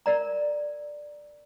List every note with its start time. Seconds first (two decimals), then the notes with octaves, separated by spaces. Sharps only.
0.06 A#4 D5 A#5